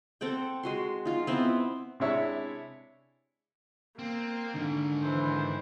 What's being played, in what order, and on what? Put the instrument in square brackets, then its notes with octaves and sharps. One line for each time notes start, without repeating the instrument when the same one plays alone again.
[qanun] C4 A4 F#5 G5
G#3 F#4 C6
D#4 F4
B3 C4 E4
[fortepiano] C3 G#3 D4 E4 C#5 E5
[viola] A#3 [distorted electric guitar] C4
[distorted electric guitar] G#2 D#3 [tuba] D3
[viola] E3 C5